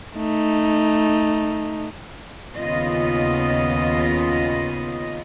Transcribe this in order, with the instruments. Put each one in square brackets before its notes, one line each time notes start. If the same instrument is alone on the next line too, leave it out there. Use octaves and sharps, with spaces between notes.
[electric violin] A3 D#4
[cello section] D#2 C#3 B3 F4 D#5